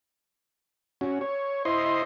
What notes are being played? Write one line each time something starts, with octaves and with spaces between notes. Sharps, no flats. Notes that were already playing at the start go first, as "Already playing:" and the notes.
C#4 F#4
C#5
E4 C5 D#5 C6